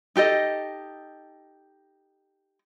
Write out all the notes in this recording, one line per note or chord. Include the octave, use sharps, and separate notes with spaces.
D#4 G4 A4 D#5